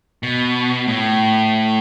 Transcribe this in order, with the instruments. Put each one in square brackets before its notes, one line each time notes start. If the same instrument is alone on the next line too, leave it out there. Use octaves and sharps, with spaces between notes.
[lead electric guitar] B2
A2